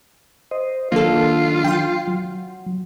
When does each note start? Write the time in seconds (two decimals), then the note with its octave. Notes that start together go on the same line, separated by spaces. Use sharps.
0.51 C5 D#5
0.92 D#3 F#3 A#3 D4 F4 A4
1.64 G5 C6
2.08 F#3